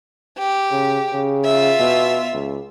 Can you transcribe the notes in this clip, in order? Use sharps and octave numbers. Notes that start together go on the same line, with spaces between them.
G4
C#3
C#3
F4 E5
B2
C#2